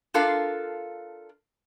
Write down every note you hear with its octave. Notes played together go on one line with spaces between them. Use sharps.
D4 F4 A4 A#4 F5